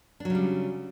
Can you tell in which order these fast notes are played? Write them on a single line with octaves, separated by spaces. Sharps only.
D4 F#3 C#3 G3